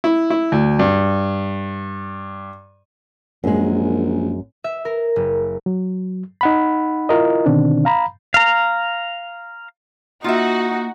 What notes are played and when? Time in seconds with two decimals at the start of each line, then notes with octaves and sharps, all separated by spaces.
0.04 E4
0.30 E4
0.52 D2
0.79 G2
3.44 A#1 F#2 G#3
4.64 E5
4.85 A#4
5.16 F#1
5.66 F#3
6.41 D#4 F#5 B5
7.09 E4 F4 A#4 D#5
7.46 B2 D3 D#3 C4 D4
7.85 F5 A#5 B5
8.34 F5 A#5
10.24 A#3 D#4 F4 F#4 E5